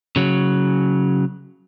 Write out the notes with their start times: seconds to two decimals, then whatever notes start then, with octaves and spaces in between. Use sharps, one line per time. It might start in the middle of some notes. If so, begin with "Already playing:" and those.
0.16 C#3 F#3